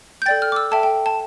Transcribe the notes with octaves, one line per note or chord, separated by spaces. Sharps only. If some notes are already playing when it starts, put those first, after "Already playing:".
G6
A4 D5 G5 A6
F6
D6
E6
A4 E5 G5 A5
G5
A5